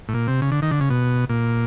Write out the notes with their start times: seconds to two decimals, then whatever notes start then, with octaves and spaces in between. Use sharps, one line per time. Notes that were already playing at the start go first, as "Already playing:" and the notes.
0.09 A2
0.14 A#2
0.28 C3
0.42 C#3
0.52 D3
0.62 D#3
0.71 D3
0.81 C#3
0.90 B2
1.29 A#2